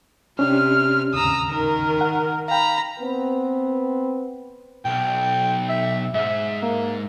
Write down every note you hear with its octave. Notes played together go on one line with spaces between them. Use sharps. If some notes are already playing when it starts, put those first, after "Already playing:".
C3 C#4 D4 G4 F6
D#2 G#2 C#3 A#5 D#6 E6
D#3 A#4
F#5 F6
F5 G5 A#5 B5
B3 C4 B4
B1 G5
E5
G#2 E5
A#3